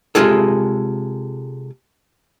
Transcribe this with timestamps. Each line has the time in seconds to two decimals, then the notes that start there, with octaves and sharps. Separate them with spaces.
0.15 C3 F3 G#3 F4 G#4 A4